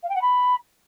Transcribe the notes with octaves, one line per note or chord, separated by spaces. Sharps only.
F5
G5
F#5
B5